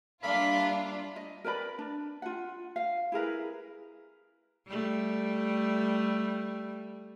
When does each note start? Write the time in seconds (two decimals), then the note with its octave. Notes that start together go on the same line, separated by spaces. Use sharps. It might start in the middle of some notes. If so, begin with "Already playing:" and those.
0.23 G3 A#3 D4 F4 E5 F5 B5
1.16 D#5
1.44 A#4 B4 D5 B5
1.79 D4
2.22 F4 F#5
2.76 F5
3.12 E4 G#4 A#4 B4
4.67 G3 A3